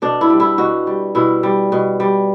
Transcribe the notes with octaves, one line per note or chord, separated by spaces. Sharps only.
B2 D4
E4
G3
E4
B2 F#4
G3
B2 E4
G3
B2
G3